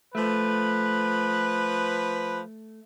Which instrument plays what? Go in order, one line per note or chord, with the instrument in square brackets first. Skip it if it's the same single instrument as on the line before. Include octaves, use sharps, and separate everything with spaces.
[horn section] F3 B4 [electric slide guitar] A3